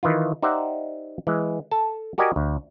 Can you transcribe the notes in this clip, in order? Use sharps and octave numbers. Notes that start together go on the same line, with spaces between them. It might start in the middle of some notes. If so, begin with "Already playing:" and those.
D#3 E3 E4 F4
D#4 G4 C5 D5 E5 F#5
E3 G#3
A4 A5
F#4 G4 A#4 D5 D#5 G#5
D2